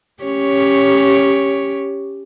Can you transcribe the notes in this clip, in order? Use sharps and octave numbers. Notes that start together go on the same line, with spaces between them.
C#4 G4 C#5